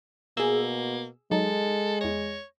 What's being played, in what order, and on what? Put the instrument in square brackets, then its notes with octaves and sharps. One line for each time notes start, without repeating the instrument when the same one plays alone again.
[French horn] B2 [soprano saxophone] A#3 [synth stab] G#4 E6
[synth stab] F#3 D#4 [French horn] G#3 [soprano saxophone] A4
[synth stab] E2 A#6 [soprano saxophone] C#5